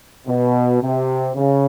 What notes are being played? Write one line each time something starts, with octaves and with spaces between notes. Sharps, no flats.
B2
C3
C#3